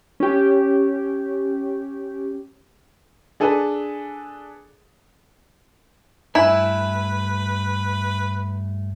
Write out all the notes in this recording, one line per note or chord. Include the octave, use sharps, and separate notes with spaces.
C#4 G4
D4 G#4 A4 B4
G2 A3 E4 B4 G#5